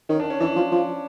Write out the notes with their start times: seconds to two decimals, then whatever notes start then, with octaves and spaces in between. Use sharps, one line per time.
0.09 D#3 C#4
0.20 D4
0.30 C#4
0.41 E3 D4
0.56 F3
0.72 F3